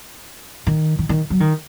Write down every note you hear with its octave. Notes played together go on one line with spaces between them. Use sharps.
D#3
D#3
D#3
F#3
D#3